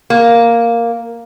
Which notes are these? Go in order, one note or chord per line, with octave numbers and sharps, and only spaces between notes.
A#3